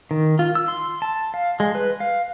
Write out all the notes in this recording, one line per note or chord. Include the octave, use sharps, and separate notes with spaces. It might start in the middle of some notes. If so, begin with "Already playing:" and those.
D#3
F4
E6
C6
A5
F5
G#3
B4
F5